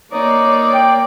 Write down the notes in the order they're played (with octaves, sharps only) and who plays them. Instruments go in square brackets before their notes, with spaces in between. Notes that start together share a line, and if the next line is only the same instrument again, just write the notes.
[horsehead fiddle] A#3 D5 [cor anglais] D#4 [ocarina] C#5
[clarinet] G5